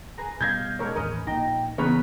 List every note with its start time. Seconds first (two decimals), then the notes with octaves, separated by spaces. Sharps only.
0.18 G#4 B4 A#5
0.41 B2 G3 C#4 D#5 F5 G6 G#6 A#6
0.79 G#3 D4 A#4 C#5
0.96 A1 D#2 G#3 C#4 A#4 B4 D#5
1.27 A#1 A#2 D#4 G5 A#5
1.78 C#3 E3 B3 B4 A#5 B5 C#6